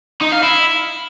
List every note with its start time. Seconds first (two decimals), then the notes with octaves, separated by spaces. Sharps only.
0.22 D#4
0.33 F5
0.44 E4